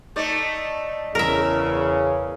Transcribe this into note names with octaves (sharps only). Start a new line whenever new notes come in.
A3 D#4 D5
E2 C#3 A#4 E5